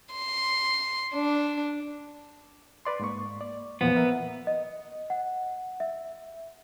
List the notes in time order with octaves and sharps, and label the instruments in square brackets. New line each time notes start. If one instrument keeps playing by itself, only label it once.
[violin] C6
D4
[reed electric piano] B4 D5 C6
G#2 A#3 C#6
D5
[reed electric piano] E2 A#2 F3 [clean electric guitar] B3
[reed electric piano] A#4 E5 F#5
[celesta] D#5
F#5
E5